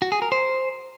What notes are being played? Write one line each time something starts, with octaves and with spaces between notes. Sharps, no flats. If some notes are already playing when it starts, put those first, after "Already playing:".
F#4
G#4
A#4
C5